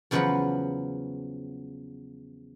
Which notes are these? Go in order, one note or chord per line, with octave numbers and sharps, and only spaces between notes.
E2 C#3 F3 F#3 B4 F#5